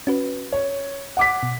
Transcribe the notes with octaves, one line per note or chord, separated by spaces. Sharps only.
C#4 F#4 B4
C#5
F#5 D6 B6
B2